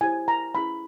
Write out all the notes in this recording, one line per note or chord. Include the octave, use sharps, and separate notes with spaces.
E4 G4 C5 G#5
A#5
C#4 E4 G#4 B5